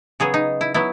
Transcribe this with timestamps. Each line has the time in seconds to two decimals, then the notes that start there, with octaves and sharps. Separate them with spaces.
0.20 C#3 F#3 B3 G#4
0.34 D#4
0.61 E4
0.74 F#3 B3 E4